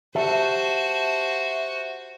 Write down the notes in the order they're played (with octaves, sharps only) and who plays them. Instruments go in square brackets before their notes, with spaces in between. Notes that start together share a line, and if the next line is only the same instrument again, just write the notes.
[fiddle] F#4 C5 [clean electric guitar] G4 E5 A5